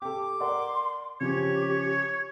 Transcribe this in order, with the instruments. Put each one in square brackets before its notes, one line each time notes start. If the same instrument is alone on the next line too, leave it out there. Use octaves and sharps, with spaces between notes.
[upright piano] G4 A4 [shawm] D6
[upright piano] A#4 D5 F#5 [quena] C6
[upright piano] C#3 F3 C#4 [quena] G4 [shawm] C#5